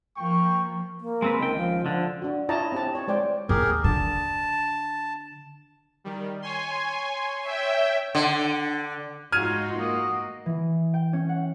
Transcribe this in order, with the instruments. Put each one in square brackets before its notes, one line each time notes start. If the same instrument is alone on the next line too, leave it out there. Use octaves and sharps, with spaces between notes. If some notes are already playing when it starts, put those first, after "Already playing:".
[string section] F3 A#3 [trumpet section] G5 C#6
[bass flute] A#3
[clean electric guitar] G#3 C4 B4
[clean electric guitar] C#2 G5 [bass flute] D#3
[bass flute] F3
[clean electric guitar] D3 [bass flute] F3
[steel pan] D4 F#4
E4 F4 C#5 D#5 A5 A#5
C4 G4 A5
C#5
G#3 C5 D5 G5
[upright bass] D#2 [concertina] G4 G#4 A#4
[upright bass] D3 [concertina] A5
[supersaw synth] D#3 G3
[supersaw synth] C#5 C6 [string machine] G#5
[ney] C#5 [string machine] E5 G5
[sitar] D3
[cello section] G#2 D#4 F4 [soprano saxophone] F#4 [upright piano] F6 G#6 D#7
[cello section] A#3 [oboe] D#5
[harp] E3
G5
C#4
F#5